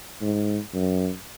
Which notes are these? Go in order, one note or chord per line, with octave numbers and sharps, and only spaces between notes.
G#2
F#2